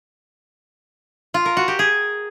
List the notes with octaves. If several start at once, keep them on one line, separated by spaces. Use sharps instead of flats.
F4
A#4
F#4
G4
G#4